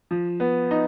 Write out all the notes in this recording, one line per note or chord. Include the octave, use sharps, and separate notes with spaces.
F3
B3
D#4